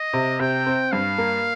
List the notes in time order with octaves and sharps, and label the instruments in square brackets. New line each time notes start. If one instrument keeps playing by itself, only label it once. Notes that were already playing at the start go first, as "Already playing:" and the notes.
Already playing: [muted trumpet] D#5
[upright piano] C3
[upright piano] C3 [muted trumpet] G5
[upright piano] C4
[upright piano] G2 [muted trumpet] F5
[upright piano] A#3